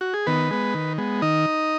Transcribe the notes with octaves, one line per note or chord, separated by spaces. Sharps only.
F#4
G#4
D#3 B3 B4
G#3 B3
D#3
G#3 B3
D#3 D#4 D#5